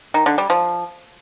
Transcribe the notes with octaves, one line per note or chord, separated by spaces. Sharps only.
D#3
D3
G3
F3